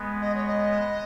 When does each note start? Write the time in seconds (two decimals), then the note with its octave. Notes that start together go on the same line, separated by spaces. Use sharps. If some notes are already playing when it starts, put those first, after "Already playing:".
Already playing: G#3 B3
0.22 D#5
0.35 C#5
0.47 D#5